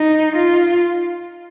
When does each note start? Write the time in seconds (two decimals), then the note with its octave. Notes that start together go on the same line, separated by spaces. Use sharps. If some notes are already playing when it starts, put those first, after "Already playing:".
Already playing: D#4
0.36 F4